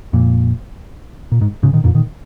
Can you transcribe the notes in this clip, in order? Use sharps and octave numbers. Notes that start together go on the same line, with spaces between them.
F2 A#2
A#2
G#2
G#2 C#3
A#2 D#3
F2 A#2
A#2 D#3